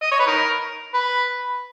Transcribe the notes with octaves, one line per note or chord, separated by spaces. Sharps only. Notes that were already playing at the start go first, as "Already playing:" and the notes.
D#5
C#5
B4
D#4 A#4
B4